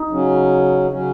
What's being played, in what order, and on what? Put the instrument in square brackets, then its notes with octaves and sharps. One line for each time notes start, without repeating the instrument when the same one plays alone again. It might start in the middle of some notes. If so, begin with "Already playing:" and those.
Already playing: [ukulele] D#4
[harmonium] C#3 F#3 C#4
C#3 F#3 C#4